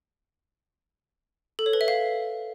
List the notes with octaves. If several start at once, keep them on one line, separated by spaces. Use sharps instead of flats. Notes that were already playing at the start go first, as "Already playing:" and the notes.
A4
C#5
B4
E5
F5